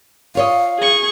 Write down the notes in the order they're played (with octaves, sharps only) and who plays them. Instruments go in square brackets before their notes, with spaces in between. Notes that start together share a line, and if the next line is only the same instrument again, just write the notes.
[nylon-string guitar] F4 C#5 D#5 [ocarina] F5
[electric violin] G#4 C#6